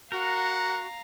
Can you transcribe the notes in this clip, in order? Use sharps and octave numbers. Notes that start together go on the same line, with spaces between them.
F#4 A#4 F5 F#5 A#5